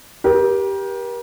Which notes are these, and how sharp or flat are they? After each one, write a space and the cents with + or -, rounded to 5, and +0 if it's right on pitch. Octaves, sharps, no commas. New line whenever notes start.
G4 +0 A#4 +40